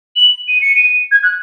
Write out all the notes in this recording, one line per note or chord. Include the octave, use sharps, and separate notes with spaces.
F#7
D#7
C#7
D#7
G#6
F#6